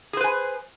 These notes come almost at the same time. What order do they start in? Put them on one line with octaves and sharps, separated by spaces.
G#4 C5 B4 G#5